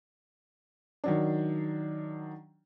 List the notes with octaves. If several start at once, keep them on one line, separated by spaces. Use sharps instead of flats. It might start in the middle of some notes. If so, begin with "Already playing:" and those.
D#3 F#3 D4